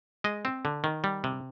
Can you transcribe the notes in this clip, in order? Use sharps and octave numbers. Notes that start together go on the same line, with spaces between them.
G#3 D#5
C4
D3
D#3
G3
C3